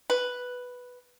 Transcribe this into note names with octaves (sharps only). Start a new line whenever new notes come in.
B4